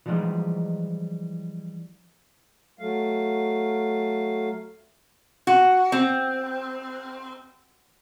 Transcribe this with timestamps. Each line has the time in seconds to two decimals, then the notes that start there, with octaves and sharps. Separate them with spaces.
0.06 E3 F3 G3 G#3 D#4
2.79 F#3 A3 F5
5.47 F#4
5.92 C4